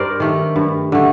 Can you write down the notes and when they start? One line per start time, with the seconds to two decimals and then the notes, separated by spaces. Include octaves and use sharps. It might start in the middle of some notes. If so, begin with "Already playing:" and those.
Already playing: G2 A#4 C5 D5
0.20 D#3 A3
0.56 G2
0.92 D3 A3